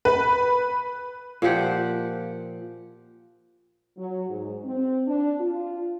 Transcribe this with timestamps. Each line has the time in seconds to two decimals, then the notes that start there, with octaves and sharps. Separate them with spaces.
0.05 B4
1.42 A#2 F3 G4 F#5
3.98 F#3
4.29 G#2
4.65 C4
5.07 D4
5.40 F4